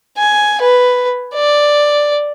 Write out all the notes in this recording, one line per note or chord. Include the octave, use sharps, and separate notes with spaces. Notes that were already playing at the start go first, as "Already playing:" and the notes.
G#5
B4
D5